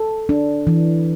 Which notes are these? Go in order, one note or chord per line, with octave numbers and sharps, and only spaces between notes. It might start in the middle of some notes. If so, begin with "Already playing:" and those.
Already playing: A4
D4
E3